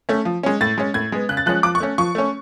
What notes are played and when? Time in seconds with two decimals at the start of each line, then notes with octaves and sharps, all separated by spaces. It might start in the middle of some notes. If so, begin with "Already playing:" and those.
0.09 A3 C#4
0.25 F3
0.43 G#3 C#4
0.61 A2 A6
0.78 G#3 C#4
0.94 A2 G#6
1.12 G#3 B3
1.29 C#3 F#6
1.37 A6
1.46 F3 G#3 C#4 F#6
1.63 F3 D6
1.75 C#6
1.80 A3 C#4
1.98 F3 C#6
2.15 A3 C#4